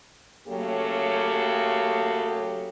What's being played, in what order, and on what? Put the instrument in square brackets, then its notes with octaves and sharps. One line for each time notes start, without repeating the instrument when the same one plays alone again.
[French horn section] C#3 F#3 A3 A#3 G4 A4